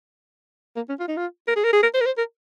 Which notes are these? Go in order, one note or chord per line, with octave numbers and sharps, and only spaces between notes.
A#3
C#4
F4
D#4
F4
A#4
G#4
A#4
G#4
A#4
C5
A#4
C5
A#4